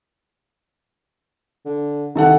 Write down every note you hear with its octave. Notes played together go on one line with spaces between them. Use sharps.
D3
C2 D#3 A4 F#5